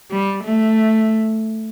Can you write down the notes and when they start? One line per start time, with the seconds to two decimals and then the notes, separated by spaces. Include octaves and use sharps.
0.11 G3
0.43 A3